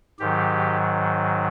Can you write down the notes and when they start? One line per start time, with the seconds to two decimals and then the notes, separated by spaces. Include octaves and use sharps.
0.19 G#2 D#3 F#3 G4